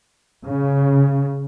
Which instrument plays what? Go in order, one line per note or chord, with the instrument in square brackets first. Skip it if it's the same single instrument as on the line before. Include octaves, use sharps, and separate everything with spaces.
[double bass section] C#3